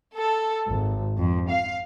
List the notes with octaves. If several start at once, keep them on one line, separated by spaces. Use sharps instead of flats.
A4
G#1
F2
F5